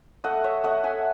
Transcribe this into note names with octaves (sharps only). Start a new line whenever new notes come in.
A3 D#5 F#5
C#5 E5
A3 D#5 F#5
E5 G#5